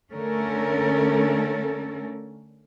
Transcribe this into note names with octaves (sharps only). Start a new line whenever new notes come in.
D3 A3 C#4 A4 A#4